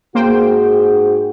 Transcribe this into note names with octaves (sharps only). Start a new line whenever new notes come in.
G#2 A#3 F#4 G#4 C5 G5